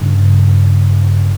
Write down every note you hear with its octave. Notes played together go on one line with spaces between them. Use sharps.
G2 C#3